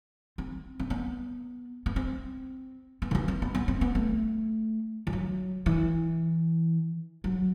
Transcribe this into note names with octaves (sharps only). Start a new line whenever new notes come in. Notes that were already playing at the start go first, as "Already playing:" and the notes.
C4
C4
B3
B3
C4
B3
D#3
E3
C4
B3
B3
C4
B3
A3
E3
F#3
E3
F#3